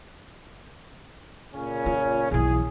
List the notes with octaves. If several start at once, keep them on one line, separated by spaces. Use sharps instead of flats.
A#2 C#3 C#4
F4
B1 E3 G#4